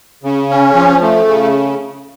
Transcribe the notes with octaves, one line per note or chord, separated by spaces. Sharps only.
C#3
C#4
F3
A3
C#3